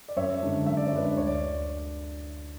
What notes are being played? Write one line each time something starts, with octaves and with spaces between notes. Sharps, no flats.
D5
F#2 C#5 E5
D3 G#3 D4
F#2 E5
D5
C#5
D3 G#3 D4 B4 D5
D2 C#5
D5